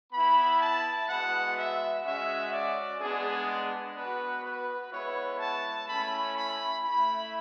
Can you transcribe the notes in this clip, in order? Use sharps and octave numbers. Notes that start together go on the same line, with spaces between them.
B3 E4 B5
A5
G#3 B3 F#4 F#5
E5
G#3 C#4 F#4 E5
D5
G#3 B3 D4 G#4
B3 F#4 B4
B4
G#3 B3 E4 C#5
A5
A3 C#4 E4 B5
B5
A3 E4 B5